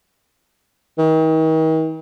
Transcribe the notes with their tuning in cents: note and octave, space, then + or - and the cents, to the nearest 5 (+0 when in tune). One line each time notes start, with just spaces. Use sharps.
D#3 +40